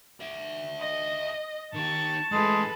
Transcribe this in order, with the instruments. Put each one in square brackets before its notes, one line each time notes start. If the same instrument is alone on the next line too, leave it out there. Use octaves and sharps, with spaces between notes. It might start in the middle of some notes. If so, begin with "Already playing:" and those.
[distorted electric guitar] D5 E5
[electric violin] D#5
[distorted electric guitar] D#3 G4 [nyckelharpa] A5 [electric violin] C#6
[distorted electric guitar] A2 E3 [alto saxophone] G#3 [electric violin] A4 B4